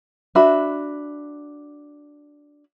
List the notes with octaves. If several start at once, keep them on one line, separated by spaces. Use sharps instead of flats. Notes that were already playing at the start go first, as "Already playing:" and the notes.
D4 F#4 E5 B5